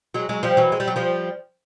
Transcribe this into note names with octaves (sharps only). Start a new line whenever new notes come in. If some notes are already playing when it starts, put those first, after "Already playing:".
F#3 G#3
F#3 G#3
F3 G3
E3 F#3
G#3
G3
F#3
F3 G3